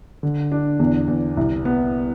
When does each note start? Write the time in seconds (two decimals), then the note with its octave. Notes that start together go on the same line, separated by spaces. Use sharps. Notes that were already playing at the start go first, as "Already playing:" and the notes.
0.23 D3
0.52 D4
0.80 E2
1.08 E2
1.37 C2
1.65 B3